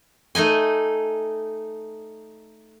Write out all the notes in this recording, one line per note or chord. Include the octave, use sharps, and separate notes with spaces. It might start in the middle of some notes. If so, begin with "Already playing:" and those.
A3 D#4 D#5 G#5